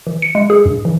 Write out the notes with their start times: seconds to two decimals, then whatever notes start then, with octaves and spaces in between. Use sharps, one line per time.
0.07 E3
0.22 C#7
0.35 G#3
0.50 G#4
0.65 G2
0.85 E3